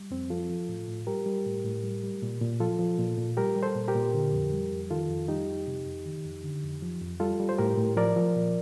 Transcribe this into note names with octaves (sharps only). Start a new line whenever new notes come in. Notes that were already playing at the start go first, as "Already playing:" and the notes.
Already playing: G3
F2 C4
F3 F4 A4
F3
A2
A2
G3 G4 A#4
G3
A2
A2
G3
G3
A#2
A#2
F3 F4 A4
F3
A#2
A#2
G3 G4 A#4
G3
A4 C5
A#2
G4 A#4
A#2
D3
F2
G3
F2
D#3 F4 A4
F2
G3 D#4 G4
F2
C3
F2
D#3
F2
D3
F2
F3
F2
G3 F4 A4
G3
C5
A2 G4 A#4
A2
F3 A#4 D5
F3
A#2